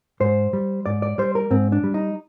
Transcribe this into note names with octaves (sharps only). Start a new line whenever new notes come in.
G#2 C5
G3
G#2 D5
D5
G3 C5
A#4
G#2 C4
D4
G3
D#4